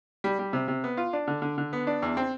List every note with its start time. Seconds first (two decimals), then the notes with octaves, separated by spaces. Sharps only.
0.24 G3
0.39 G3
0.53 C3
0.68 C3
0.84 B3
0.97 F4
1.13 D4
1.28 D3
1.42 D3
1.58 D3
1.73 B3
1.87 D4
2.02 E2
2.17 C4